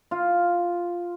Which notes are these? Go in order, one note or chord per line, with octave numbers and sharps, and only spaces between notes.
F4